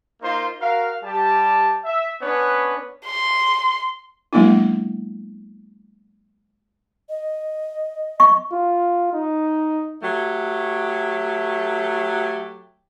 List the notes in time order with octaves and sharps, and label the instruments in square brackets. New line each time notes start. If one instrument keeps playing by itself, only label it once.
[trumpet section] A#3 D#4 F4 C5 C6
F#4 A#4 F5
G3 G4 A5
E5
B3 C#4 D4 B4 C#5
[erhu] C6
[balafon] F#3 G#3 A#3 B3 D4 E4
[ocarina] D#5
[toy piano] C#6
[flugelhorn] F4
D#4
[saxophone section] F#3 A3 G4